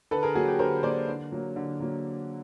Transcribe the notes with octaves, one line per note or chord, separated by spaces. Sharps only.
D3 A4 B4
G#4 A#4
F#3 A#3 F#4 G#4
G4
D3 A#4 C5
F#3 A#3 C5 D5
D3
F#3 A#3
D3
F#3 A#3